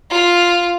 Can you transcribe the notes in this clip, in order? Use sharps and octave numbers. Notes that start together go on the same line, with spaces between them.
F4